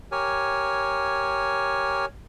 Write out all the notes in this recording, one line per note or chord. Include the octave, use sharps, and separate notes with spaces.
G4 A#4 C#5 G#5